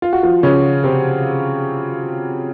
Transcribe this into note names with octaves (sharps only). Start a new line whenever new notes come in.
F4
F#4
F3 F4
C#3 C#4
C3 C4